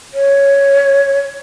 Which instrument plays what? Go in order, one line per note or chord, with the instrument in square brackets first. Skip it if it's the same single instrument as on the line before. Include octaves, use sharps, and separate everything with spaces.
[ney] C#5